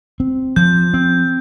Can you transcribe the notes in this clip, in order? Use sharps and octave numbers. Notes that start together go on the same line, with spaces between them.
C4
F3 G6
C4